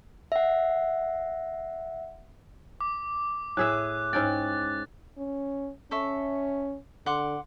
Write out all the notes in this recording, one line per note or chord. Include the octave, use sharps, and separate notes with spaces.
E5 F#5
D6
A2 G#4 E5 F#6
G#2 C#4 G5 A6
C#4
C#4 A4 E5 C#6
D3 F#5 C6 D6